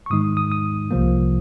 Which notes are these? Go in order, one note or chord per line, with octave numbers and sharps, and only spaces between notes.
C#6
G#2 D#3 G#3 D#4 D#6
D#6
D#6
C2 C3 F3 A#3